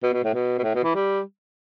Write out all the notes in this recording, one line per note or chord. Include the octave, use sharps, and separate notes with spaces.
B2
B2
A2
B2
B2
A2
B2
E3
G3